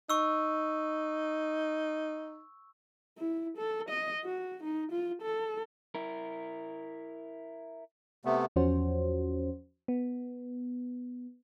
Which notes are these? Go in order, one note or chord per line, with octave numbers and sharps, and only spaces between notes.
D#4 C#6 E6
E4
A4
D#5
F#4
D#4
F4
A4
E4 A#4
C3 A3 B3
E2 F3 C#4 F#4 C5
B3